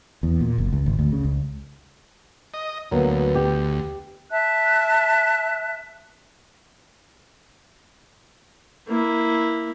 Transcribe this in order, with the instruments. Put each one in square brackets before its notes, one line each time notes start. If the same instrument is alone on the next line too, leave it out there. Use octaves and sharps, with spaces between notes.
[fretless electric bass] E2
A#2
F#1
C#2
G#1
D2
C#3
C#2
[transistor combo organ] D#5
[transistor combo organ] D2 [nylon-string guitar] F#3 A#3 B3
[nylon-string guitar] G4
[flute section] E5 A5 F#6
[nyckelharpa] A#3 E4